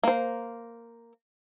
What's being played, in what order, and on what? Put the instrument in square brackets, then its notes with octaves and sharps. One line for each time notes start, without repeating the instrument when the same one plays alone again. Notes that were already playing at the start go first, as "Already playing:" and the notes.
[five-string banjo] A#3 C5